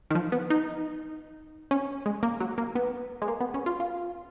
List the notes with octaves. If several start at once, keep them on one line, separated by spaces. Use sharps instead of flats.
D#3
F3
B3
D#4
C#4
G#3
A#3
F#3
A#3
B3
G#3
A#3
B3
C#4
F4
F4